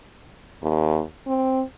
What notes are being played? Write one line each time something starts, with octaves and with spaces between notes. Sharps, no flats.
D#2
C4